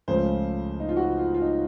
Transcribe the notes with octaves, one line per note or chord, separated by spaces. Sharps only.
C#2 C#3 F3 A3 C5
D#4
F4
F#4
F4
F4
D#4